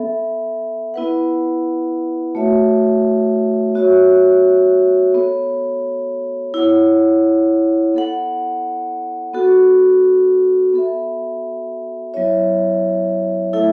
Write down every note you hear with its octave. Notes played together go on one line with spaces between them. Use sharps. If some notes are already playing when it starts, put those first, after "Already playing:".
Already playing: B3 A4 E5
B3 E4 B4 F#5
A3 F#4 C#5 E5
B3 F#4 C#5 E5
B3 A4 C#5
E4 C#5 F#5
B3 A4 F#5
B3 F#4 A4
B3 A4 E5
F#3 B3 E4 C#5 E5
A3 E4 A4 E5